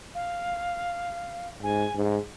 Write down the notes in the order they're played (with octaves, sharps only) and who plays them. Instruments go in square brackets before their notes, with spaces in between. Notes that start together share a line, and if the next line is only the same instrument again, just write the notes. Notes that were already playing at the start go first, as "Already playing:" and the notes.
[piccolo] F5
[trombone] G#2 [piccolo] G#5
[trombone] G#2